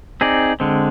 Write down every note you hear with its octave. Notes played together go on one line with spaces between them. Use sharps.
C4 D#4 G#4 D5
D3 G#3 C4